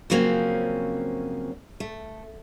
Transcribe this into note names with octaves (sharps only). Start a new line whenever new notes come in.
C#3 F3 F#3 A#3 C4 C#4
A3